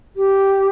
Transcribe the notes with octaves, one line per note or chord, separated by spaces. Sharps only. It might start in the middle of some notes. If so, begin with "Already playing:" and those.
G4